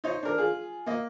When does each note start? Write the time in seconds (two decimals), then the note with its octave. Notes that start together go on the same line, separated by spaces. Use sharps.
0.04 D#4 C5 C#5 D#5
0.23 D4 A#4
0.38 F4 G#4
0.86 A#3 D#5